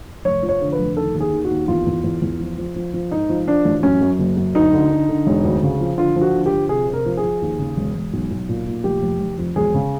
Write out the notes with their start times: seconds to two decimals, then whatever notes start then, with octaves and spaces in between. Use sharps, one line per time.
0.25 F1 C#5
0.43 F3
0.49 C#5
0.61 D3
0.72 B4
0.79 F1
0.97 D#3 A4
1.14 D#2
1.20 G#4
1.32 D#3
1.45 F#4
1.50 D#2
1.68 E2 F4
1.87 E2
2.04 E2
2.22 E2
2.40 F3
2.58 F3
2.76 F3
2.94 F3
3.11 G#2 D#4
3.29 F3
3.47 F3 D4
3.65 A1
3.83 F#2 C#4
4.01 F#2
4.19 F#1
4.37 F#2
4.55 D2 D#4
4.73 D3
4.91 D3
5.09 D3
5.27 E1
5.44 D2
5.63 C#3
5.80 F3
5.98 D3 F4
6.16 F3
6.21 F#4
6.34 D3
6.46 G4
6.52 F3
6.69 C3 G#4
6.88 C3
6.93 A#4
7.06 F3
7.17 G#4
7.23 F3
7.42 D#2
7.59 C#3
7.77 E1
7.95 E1
8.13 B1
8.31 B1
8.49 A#2
8.67 A#2
8.84 F1 G4
9.03 F1
9.21 F1
9.38 F2
9.56 E1 G#4
9.74 C#3